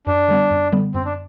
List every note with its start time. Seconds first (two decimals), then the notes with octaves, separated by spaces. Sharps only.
0.07 F#2 D4
0.29 D3 G3 B3
0.51 F#2
0.72 D3 G3 B3
0.94 F#2 C4
1.05 D4